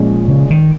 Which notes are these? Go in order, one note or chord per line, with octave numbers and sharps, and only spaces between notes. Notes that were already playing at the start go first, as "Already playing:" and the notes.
Already playing: A#2 F3 G#3 C#4
C#3
D#3